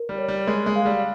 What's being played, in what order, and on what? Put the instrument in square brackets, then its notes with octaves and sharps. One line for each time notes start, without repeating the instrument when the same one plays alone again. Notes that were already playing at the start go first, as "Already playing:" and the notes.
Already playing: [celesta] A#4
[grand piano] G3
[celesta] C#5
[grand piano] G3
[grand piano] G#3 [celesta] A#4
[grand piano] G#3
[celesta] F5
[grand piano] G3